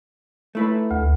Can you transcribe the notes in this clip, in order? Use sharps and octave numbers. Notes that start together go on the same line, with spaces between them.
A3 E4 B4
D2